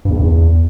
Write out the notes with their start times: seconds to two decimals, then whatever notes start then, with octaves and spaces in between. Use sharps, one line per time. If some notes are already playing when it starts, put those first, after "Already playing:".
0.05 G2
0.10 E2
0.16 G2
0.21 E2